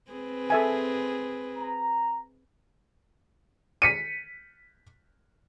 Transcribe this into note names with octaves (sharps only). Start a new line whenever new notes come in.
C4 G#4 B4
A4 E5 G#5
A#5
B6 C#7 D#7